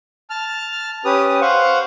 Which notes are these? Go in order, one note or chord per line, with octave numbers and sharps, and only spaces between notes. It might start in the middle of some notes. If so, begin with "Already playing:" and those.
A5 F6
C#4 G4 B4 D#6
C5 F5 F#5 C#6